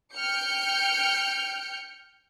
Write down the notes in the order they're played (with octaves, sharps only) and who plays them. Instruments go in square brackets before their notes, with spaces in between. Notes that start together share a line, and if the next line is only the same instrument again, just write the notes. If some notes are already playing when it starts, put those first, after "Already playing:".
[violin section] G5 F6 G6 C#7